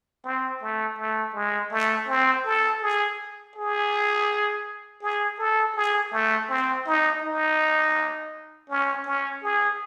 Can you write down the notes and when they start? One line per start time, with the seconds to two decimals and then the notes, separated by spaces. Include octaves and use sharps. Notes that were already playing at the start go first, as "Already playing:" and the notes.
0.24 C4
0.62 A3
0.99 A3
1.34 G#3
1.72 A3
2.08 C4
2.45 A4
2.82 G#4
3.56 G#4
5.02 G#4
5.39 A4
5.75 G#4
6.12 A3
6.49 C4
6.86 D#4
7.22 D#4
8.69 C#4
9.06 C#4
9.43 G#4